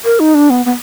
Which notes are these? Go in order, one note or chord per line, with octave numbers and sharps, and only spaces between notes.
A#4
D#4
D4
B3
B3